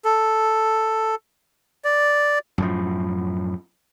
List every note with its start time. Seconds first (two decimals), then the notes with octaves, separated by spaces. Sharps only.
0.05 A4
1.84 D5
2.58 F#2 A2 F3